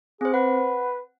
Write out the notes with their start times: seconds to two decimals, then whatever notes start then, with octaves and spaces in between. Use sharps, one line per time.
0.21 C4 G#4 C5
0.34 B4 F#5